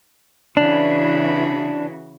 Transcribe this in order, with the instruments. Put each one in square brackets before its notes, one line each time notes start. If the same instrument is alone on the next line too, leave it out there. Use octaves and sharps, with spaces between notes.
[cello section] C#3 E3 F#4 [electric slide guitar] D4